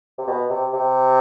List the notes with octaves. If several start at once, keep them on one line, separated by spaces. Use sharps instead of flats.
C3
B2
C3
C3